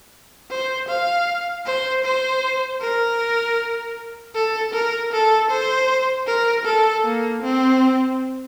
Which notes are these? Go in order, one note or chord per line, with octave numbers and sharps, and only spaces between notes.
C5
F5
C5
C5
A#4
A4
A#4
A4
C5
A#4
A4
A#3
C4